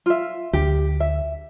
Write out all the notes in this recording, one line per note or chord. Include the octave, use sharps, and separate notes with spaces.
F4 E5
D2 G4
E5